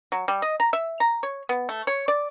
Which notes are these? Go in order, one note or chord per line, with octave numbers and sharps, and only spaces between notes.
F#3
G3
D#5
A#5
E5
A#5
C#5
B3
A3
C#5
D5